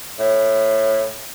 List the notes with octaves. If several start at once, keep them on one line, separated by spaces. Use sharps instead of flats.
A2